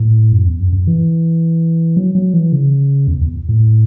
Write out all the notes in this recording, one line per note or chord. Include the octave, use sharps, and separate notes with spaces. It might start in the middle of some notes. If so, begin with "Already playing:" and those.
Already playing: A2
F#2
E2
F#2
F#2
E3
F#3
F#3
E3
C#3
E2
E2
A2